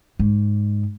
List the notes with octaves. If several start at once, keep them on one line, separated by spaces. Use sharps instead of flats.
G#2